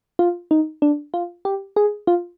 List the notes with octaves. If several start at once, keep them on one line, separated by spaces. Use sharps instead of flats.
F4
D#4
D4
F4
G4
G#4
F4